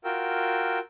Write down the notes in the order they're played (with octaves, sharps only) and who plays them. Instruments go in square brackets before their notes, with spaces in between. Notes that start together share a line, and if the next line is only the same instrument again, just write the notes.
[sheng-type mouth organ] F4 F#4 A#4 G5 E6